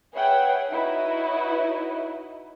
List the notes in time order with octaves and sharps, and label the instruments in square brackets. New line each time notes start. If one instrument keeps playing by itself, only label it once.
[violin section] G#4 B4 C#5 E5 F#5 G5
D#4 E4 F#4 B4 C#5 D#5